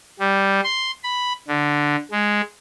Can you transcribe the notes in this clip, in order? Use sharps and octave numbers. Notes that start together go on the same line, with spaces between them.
G3
C6
B5
D3
G#3